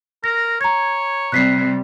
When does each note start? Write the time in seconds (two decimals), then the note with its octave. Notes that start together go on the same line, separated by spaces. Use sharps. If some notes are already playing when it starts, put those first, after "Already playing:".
0.24 A#4 A#6
0.61 C#5 A#5 G#6
1.32 C3 G3 F#6 B6 C7